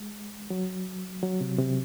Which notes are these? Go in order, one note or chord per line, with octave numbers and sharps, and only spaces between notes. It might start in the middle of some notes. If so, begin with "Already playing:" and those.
Already playing: G#3
F#3
F#3
C3
C3